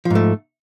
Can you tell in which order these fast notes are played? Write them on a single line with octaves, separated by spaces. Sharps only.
F3 G#2 A3